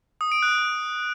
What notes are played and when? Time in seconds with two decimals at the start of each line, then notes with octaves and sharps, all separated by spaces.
0.21 D#6
0.32 D7
0.42 F#6